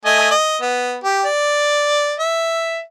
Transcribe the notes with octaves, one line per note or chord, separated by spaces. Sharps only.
A3 D#5 G#5
D#5
B3
G4
D5
E5